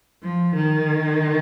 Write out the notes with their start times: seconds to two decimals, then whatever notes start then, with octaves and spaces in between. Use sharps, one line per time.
0.22 F3
0.55 D#3